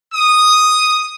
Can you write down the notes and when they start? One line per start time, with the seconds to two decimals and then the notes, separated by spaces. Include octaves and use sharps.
0.13 D#6